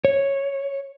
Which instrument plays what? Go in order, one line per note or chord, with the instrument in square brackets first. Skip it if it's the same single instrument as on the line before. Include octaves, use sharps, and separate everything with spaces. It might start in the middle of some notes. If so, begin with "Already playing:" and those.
[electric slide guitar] C#5